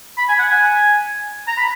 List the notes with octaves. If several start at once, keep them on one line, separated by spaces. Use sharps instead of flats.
B5
G#5
F#5
G#5
A#5
B5